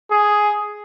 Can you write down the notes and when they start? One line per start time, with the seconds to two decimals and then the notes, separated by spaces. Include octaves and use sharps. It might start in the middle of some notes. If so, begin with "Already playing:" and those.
0.12 G#4